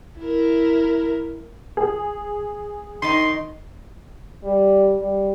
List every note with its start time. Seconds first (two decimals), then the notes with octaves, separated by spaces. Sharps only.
0.21 E4 A#4
1.77 G#4
3.02 D#3 D#4 C6
4.44 G3
4.99 G3